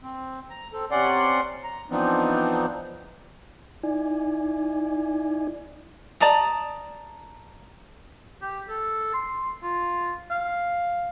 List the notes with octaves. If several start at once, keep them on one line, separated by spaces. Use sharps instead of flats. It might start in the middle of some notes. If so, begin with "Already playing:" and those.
C4
A#5
C4 A4
C3 C#4 D5 F#5 C6
A#5
E3 F3 B3 C4 D4 D#4
D#4 E4 D5 G#5
D5 A5 A#5 D#6
G4
A4
C6
F4
F5